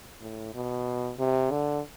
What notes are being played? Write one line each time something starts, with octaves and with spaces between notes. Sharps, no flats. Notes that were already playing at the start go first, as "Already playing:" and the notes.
A2
B2
C3
D3